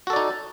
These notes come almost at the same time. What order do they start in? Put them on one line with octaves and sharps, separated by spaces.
F#4 A4 D5 D#4